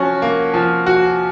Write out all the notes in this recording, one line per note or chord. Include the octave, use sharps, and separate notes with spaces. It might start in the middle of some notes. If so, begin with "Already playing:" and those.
Already playing: F3 C#4 F#4
A#3
F3
F#4